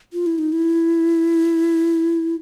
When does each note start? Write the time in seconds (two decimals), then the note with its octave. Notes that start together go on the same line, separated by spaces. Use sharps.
0.13 F4
0.26 E4
0.38 D#4
0.52 E4